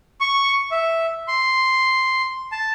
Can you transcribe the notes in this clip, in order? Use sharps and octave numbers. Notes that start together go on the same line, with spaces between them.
C#6
E5
C6
A5